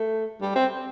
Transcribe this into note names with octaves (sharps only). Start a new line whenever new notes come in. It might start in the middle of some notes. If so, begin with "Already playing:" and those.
Already playing: A3
G3
C4